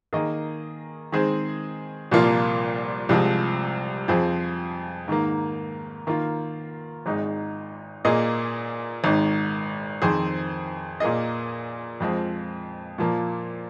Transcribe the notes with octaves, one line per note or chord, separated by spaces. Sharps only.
D#3 A#3 G#4 D#5
D#3 G#3 C4 G#4 C5
C2 A#2 F3 A#3 F4
C2 C3 F3 G#3
F2 F3 C4 G#4
G#2 D#3 A#3
D#3 A#3 F4
G#1 G#2 G#3 D#4
A#2 A#3 G#4 D#5
G#1 G#2 D#3
F2 D#3 C4 G#4 C5
A#2 A#3 G#4 D#5
F2 F3 G#3 C4
A#2 F3 A#3